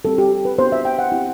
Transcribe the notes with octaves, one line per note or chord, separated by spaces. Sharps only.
G3 C4 G4 A4
G4
B4
B3 D4 F#4 C5
E5
G5
F#5
C4 E4 G4